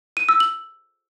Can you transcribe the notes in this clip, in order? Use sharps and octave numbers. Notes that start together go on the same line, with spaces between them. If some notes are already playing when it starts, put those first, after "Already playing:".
D#7
E6
F#7